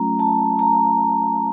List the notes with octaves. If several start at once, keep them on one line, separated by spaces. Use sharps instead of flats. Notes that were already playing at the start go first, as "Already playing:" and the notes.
Already playing: F#3 A3 C#4 F4 A#5
A5
A#5